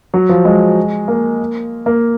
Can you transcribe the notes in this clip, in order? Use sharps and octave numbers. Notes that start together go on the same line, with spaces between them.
F#3
F3
G#3
A#3
A#3